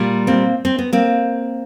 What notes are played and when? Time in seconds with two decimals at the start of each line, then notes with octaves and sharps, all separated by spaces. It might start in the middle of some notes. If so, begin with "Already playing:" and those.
Already playing: A#2 G3
0.27 A#3 C4
0.65 C4
0.79 B3
0.93 A#3 C4